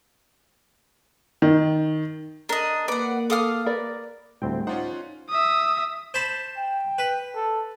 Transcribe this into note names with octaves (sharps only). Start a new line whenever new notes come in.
D#3
D4 A#4 D#5
A#3 B4 D5 F#5
A4 F5 D6 D#6 F6
A#4 B4 D5
D2 A2 G3 C4 G5
C#4 D#4 F4 C5 D5 F#5
E5 D#6
C5 A5 B5
G5
B4
A4